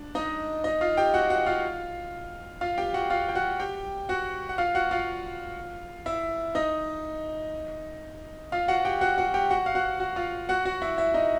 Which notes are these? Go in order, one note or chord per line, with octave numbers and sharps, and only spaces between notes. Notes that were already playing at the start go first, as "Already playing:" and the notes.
Already playing: D4
D#4 D#5
D#4 D#5
F4 F5
G4 G5
F#4 F#5
F#4 F#5
F4 F5
F4 F5
G4 G5
F#4 F#5
F4 F5
G5
F#4 F#5
G4 G5
F#4 F#5
F#5
F4 F5
F#4 F#5
F4 F5
E4 E5
D#4 D#5
F4 F5
F#4 F#5
G4 G5
F#4 F#5
F#4 F#5
G4 G5
F#4 F#5
F5
F#4 F#5
F#4 F#5
F4 F5
F#4 F#5
F#4 F#5
E4 E5
E4 E5
D#4 D#5